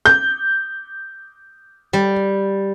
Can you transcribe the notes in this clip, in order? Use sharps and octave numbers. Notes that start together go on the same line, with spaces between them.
G6
G3